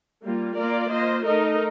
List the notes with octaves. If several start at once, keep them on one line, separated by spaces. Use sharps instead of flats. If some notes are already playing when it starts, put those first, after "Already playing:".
G3 A#3 F4
A#3 F4 A#4 D5
A#3 F4 C5 D#5
A3 D#4 A#4 D#5